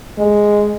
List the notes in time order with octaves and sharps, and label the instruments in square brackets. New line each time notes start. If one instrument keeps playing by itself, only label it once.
[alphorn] G#3